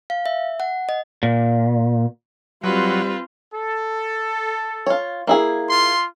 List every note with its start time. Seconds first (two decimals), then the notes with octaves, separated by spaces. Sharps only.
0.10 F5
0.26 E5
0.60 F#5
0.89 D#5
1.23 A#2
2.63 F#3 G3 C4 F4 B4
3.54 A4
4.87 F4 C#5
5.27 A#3 E4 G#4
5.69 F4 C6